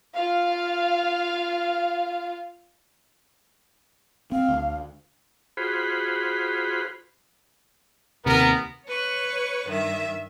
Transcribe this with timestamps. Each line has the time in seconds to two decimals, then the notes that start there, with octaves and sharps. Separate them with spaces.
0.14 F4 F5
4.32 C4 F5
4.48 D2
5.57 F4 F#4 G#4 C5 B5
8.26 D#2 C3 B3 A#4
8.87 B4 C#5 C#6
9.68 G2 D#3 E5